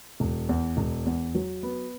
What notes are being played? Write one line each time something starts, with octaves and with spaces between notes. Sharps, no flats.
E1
E2
E1
E2
F#3
B3